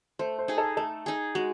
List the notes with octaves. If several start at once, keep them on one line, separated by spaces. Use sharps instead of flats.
A3 C5
C5
D#4 G#4
A4
A3 A4
D#4 G#4
G#3 F#4